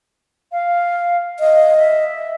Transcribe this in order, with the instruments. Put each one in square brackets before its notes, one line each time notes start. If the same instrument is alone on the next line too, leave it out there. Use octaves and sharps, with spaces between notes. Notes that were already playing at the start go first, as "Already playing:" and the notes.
[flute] F5
[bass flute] D#5 [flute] F5
[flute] E5